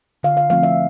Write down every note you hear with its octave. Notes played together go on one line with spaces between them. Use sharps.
D3 F5
F5
F3 A3 C4 F5
E5